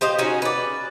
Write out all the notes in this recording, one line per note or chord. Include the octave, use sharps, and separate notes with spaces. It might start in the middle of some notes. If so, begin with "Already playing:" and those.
G4 C5 D#5 F5
C#4 D#4 F#4 G#4
B4 D5